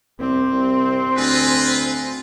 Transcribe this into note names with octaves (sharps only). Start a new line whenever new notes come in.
C2 C4 G4
C2 C6
D2 F4 B4 D#5 G#5